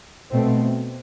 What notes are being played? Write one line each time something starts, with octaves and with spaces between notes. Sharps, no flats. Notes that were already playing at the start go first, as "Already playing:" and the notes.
B2 A3 C4